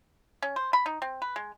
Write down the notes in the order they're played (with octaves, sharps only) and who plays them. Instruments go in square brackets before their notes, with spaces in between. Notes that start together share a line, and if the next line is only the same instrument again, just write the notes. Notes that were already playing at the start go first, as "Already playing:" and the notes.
[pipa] C#4
C5
B5
D#4
C4
B4
G#3